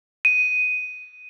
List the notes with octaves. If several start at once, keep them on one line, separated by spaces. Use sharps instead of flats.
D#7